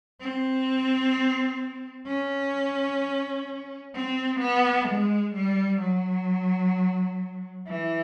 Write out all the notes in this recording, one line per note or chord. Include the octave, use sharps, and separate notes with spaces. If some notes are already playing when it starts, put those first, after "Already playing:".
C4
C#4
C4
B3
G#3
G3
F#3
E3